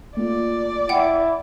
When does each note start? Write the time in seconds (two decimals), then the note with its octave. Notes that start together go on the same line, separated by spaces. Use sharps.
0.17 A3 A#3 F4 D5
0.89 E4 F#5 G5